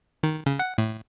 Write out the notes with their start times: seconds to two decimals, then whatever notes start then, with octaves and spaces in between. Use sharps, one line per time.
0.23 D#3
0.46 C#3
0.59 F#5
0.78 A2